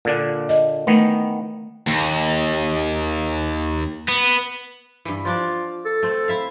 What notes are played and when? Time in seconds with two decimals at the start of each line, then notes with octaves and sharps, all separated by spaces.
0.05 A#2 D3 D4
0.49 D#5
0.87 D#3 E3 A3 B3
1.87 D#2
4.09 B3
5.05 G2 E3
5.25 F3 D4 F4 D5
5.85 A4
6.03 A3 C4
6.28 E4 E5 F5